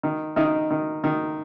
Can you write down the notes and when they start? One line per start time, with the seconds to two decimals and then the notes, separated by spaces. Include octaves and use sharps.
0.03 D#3
0.36 D#3 D#4
0.71 D#3
1.04 D#3